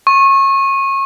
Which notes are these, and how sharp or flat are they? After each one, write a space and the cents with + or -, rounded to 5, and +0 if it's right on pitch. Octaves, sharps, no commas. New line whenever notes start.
C#6 -25